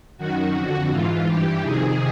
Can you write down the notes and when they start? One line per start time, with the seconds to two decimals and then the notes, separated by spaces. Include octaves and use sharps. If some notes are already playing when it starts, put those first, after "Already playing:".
0.18 F#2 D#3 F#4
0.54 F2 D3 F#4
0.90 G#2 E3 F4
1.26 G2 E3 G4
1.63 F2 C3 D#3 G#4